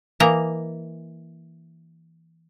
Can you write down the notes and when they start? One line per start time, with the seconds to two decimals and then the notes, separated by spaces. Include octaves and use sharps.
0.20 E3 A#3 D#5 A#5